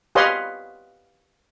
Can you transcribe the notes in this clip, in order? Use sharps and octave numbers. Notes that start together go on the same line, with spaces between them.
G4 B4 C#5 D#5 F5 C6